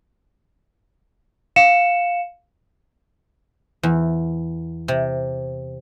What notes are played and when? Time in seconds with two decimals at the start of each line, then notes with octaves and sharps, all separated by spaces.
1.56 F5 C#7 E7
3.83 E2
4.88 C3